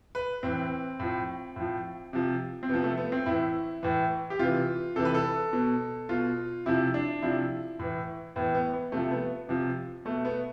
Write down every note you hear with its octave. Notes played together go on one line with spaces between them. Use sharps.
B4
A2 E3 C4
A2 F3
A2 F3
C3 F3
C4
C3 F3 B3
A3
B3
C4
A2 E3 E4
A2 E3
G4
C3 E3 F4
C3 E3 A4
B4
A4
B2
B2 F4
C3 F3 E4
D4
C3 F3 E4
A2 E3
A2 E3 B3
B3
B3
C3 F3 A3
B3
C3 F3
B2 A3
B3